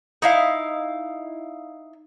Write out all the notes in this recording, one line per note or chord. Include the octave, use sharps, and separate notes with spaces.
D#4 E4 F5